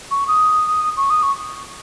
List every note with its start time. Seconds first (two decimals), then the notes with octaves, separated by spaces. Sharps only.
0.11 C#6
0.28 D#6
0.97 C#6
1.10 D#6
1.23 C#6